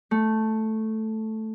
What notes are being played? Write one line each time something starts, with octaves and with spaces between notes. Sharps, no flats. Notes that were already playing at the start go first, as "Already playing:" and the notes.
A3